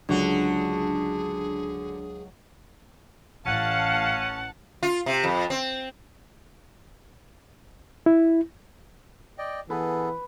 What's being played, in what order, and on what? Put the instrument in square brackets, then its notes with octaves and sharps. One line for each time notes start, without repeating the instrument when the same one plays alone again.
[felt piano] C#2 F#3 [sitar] D3 F#4 [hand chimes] D4 [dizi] G#4
[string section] A1 A5 [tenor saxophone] C#4 [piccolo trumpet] F5 [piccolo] F#5
[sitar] F4
C3
F2
C4
[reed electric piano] E4
[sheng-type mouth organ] D5 D#5 G5
[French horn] E3 [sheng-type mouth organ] B3 G#4 A4 [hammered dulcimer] B4